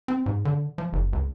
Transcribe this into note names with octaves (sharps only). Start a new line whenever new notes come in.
C4
G#2
D3
F3
F#1
C#2